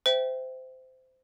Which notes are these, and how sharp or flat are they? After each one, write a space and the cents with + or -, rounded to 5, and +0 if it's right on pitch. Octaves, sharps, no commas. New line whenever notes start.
C5 -20 E5 +0 G5 +0